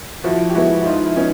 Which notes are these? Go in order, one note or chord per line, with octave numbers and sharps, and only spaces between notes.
F3 E4 F#4
G4
G#3 B3 E4 F#4
E4
F3 D#4 F4
E4
B3 C#4 D#4